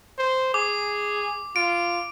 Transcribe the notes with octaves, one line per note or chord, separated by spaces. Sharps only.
C5
G#4 D6
F4 D7